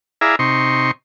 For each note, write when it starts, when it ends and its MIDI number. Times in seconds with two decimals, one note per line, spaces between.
0.21 0.36 64
0.21 0.36 68
0.21 0.36 74
0.21 0.36 76
0.21 0.36 77
0.21 0.36 82
0.39 0.91 48
0.39 0.91 63
0.39 0.91 84
0.39 0.91 85